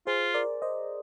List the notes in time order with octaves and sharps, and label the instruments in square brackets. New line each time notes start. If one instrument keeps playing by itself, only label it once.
[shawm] F4 [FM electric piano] G#4 C5
[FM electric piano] A#4 D5
C5 D#5